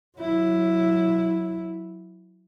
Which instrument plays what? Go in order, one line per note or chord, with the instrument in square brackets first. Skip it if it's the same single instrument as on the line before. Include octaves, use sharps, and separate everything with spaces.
[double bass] F#3 E4